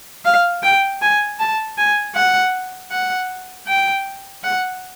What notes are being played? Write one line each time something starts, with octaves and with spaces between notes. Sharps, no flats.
F5
G5
G#5
A5
G#5
F#5
F#5
G5
F#5